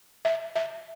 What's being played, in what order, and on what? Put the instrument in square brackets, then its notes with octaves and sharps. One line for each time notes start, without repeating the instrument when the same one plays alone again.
[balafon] E5
E5